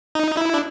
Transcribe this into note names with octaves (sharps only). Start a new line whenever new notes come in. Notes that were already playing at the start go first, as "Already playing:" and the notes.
D#4
E4
D4